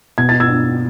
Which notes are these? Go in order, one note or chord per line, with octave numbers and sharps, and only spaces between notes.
B2 G#6
A6
E6 G#6
D4